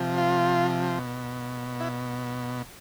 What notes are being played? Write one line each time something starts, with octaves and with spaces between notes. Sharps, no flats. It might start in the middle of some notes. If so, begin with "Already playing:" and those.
Already playing: C3 F3
F4
B2
E4